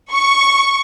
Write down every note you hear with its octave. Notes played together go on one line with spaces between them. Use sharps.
C#6